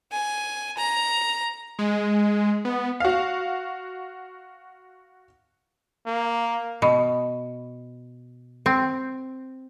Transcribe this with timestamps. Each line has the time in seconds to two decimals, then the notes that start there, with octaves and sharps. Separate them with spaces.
0.12 G#5
0.77 A#5
1.79 G#3
2.65 B3
3.00 F#4 F5
6.06 A#3
6.82 B2
8.66 C4